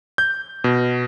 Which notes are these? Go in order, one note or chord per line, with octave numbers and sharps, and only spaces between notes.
G6
B2